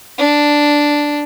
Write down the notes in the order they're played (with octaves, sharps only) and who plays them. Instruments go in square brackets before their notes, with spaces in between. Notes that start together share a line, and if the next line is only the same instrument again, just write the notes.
[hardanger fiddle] D4